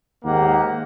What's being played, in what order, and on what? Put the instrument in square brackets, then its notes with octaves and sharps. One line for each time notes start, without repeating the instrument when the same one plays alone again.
[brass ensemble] D#2 G#2 A#3 G4 F#5